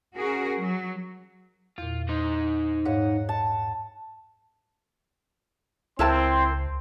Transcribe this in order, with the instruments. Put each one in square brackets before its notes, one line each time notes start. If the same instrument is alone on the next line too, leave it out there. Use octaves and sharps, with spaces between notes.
[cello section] C#4 F#4 G#4 A#4
F#3
[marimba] E2 A#2 [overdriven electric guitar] F4
[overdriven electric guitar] D#4 C5
[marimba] G#2 C#5 F5 [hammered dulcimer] F#5
[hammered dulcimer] A5
[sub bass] C#2 [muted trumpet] C4 [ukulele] E4 A#4 A5 [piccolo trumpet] C6